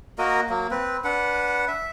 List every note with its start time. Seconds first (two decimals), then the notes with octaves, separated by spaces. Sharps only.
0.18 A#3 F#4 A#4 D#5
0.49 F#3 A#3
0.71 C4 B4
1.04 D4 B4 F#5
1.68 E5